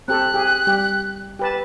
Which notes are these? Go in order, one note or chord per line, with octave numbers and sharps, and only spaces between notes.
C4 G4 A4 F#6
G4 G#4
G3 G4
G4 B4 A5